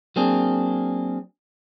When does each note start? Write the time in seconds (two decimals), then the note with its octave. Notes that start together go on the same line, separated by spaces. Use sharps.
0.16 F#3 A#3 C4 D4 G#4